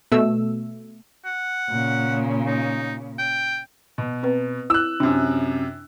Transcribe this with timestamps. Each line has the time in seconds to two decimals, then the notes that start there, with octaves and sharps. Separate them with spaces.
0.12 B2 A3 E6
1.25 F#5
1.70 A#2 C#3
2.46 D#4
3.19 G5
3.98 B2
4.23 C4 B4
4.70 E4 E6 F#6
5.00 F#2 C3 D4